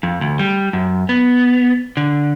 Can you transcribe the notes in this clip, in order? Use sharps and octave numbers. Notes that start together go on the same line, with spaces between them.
F2
D2
G3
F#2
B3
D3